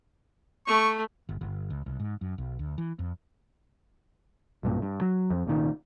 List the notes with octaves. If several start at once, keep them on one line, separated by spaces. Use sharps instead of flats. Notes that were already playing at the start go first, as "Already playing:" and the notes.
A3 C#6
G1
G1
C#2
C2
G#2
F#2
B1
D2
E3
F2
B1 G2 A#2
G2
F#3
F2
C2 A#2 D#3